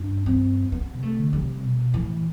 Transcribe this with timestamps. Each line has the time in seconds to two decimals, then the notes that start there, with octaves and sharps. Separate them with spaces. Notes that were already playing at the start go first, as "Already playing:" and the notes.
Already playing: G2 D4
0.26 C4
0.72 B3
0.95 C3
1.03 A3
1.18 D3
1.33 G3
1.41 C3
1.63 B2
1.93 A2 E3